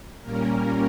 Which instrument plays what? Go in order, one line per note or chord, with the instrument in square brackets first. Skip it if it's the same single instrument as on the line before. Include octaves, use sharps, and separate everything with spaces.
[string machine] A#2 G3 A#3 C#4 A#4